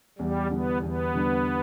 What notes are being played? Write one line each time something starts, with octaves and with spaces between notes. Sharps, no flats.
E2 G3
D3 G3 B3 D4
E2 B3
D3 G3 D4